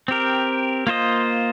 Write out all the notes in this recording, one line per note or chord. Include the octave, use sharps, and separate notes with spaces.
C4 G4 A#4
A#3 F4 C5 D#5